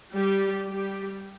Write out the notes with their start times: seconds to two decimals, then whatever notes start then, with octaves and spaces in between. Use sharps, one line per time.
0.14 G3 G4
0.68 G3 G4